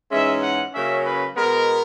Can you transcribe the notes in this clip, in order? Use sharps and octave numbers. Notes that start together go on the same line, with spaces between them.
G#2 E3 G#3 C#4 E5
F#5
C#3 F#3 A#3 C#4 E5
B4
B2 G#3 B3 A#4